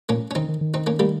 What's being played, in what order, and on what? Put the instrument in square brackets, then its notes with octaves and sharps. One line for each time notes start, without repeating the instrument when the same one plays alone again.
[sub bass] A#2 [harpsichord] A#3 C#4
[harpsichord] C#4
[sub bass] D#3 [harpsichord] C4 D#4
[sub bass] D#3
D#3
[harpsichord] C4 D#4
A#3 C#4
G3 A#3